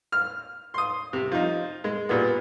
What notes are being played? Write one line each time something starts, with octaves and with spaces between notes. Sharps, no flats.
F6
C6 D#6
C3
F3 D#4
G#3
A#2 G3 B3